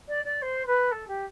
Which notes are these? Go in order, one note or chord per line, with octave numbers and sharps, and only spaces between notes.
D5
D5
C5
B4
A4
G4